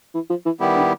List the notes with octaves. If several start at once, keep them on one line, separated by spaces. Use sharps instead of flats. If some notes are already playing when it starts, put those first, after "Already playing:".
E3
F3
E3
D#3 G3 B3 E4 G4
D3